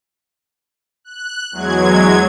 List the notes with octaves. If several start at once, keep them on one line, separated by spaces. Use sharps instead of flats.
F#6
E2 F#3 G#3 G#6